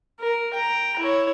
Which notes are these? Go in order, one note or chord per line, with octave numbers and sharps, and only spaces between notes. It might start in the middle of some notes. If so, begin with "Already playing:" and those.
A#4
G5 A#5
E4 C#5